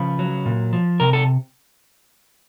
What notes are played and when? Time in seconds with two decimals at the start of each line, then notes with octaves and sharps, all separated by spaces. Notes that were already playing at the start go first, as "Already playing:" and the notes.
Already playing: C#3 F3 B4
0.19 F#3
0.46 A#2
0.73 F3
1.00 C3 A#4
1.13 A4